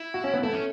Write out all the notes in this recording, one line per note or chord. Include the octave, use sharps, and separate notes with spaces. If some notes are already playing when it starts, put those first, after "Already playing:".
Already playing: E4
F#4
C#4
B3
A3 E4
C#4